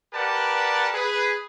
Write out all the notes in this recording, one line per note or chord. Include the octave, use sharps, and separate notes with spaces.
G4 A#4 B4 D5 F#5 A5
G#4 B4